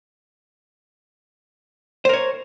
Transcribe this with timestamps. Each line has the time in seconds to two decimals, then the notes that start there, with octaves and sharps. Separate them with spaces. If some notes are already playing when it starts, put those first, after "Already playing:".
2.05 C5
2.09 A#4
2.13 C#5